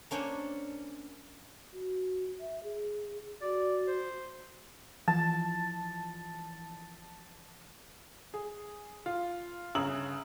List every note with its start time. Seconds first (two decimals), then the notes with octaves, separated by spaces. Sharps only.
0.11 A#3 C#4 D4 C5 C#5
1.73 F#4
2.40 E5
2.63 G#4
3.41 F#4 D5
3.87 C5
5.08 E3 F3 A5
8.34 G#4
9.06 F4
9.75 G1 C#3 A#5 D#6 E6 F#7